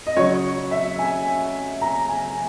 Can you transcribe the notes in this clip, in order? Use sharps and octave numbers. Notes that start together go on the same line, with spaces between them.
D#5
C#3 F#3 C#5
E5
G#5
A#5
G#5